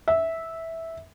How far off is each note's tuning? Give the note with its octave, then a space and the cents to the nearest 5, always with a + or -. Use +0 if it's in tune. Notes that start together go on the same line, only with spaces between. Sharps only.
E5 -10